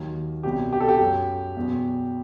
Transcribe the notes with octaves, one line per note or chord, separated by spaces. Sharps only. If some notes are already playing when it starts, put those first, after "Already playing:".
Already playing: D#2 D#3 F#3
C2 B2 F#3 G4
G4
A4
G4
F#2 F#3
E2 B2 F#3